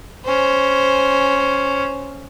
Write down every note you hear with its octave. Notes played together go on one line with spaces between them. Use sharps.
C#4 C5